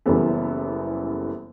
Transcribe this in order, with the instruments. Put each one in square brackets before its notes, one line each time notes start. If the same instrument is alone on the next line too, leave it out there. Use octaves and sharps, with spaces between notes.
[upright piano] F#1 F#2 E3 G3 B3 A4